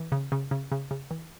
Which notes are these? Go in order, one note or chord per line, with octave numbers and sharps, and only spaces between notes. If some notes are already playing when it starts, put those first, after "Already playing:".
Already playing: E3
C#3
C#3
C#3
C#3
C#3
E3